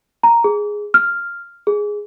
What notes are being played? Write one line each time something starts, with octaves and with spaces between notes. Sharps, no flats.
A#5
G#4
F6
G#4